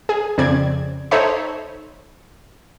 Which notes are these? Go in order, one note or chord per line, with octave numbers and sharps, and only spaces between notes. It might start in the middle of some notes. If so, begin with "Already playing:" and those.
G#4
F2 C#3 C4 D5 G#6
D#4 A4 C5 C#5 E5 B5